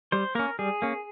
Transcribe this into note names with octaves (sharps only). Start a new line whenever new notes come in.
G3 C5
A#3 C#4 A#4
G3 G#4
A#3 C#4